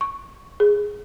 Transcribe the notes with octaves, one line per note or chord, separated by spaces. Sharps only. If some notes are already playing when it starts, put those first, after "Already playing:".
C#6
G#4